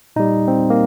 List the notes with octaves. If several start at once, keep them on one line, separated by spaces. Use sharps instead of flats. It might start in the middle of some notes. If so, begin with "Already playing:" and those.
A#2 G3 D#4
C4
A#3